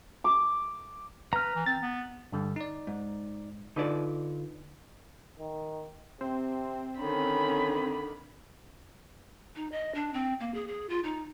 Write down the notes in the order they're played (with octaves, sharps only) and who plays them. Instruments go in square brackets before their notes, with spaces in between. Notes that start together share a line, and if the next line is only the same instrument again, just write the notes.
[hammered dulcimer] D6
[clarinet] B4 [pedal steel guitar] A#5 F6
[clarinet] E3
[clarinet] C4 [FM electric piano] A6
[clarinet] B3
[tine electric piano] G2 D3 G3
D#4 D5
[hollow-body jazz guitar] G#2
[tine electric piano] D3 F4 [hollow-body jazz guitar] D#4 B4 D5
[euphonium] D#3
[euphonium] C3 [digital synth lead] C4
[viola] D3 D#3 [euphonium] C#4 [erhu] B5
[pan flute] D#4
D#5
D4
C4
A#3
G#4
G#4
F4
D#4